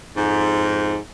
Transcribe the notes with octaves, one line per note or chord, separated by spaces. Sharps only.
F2 G#2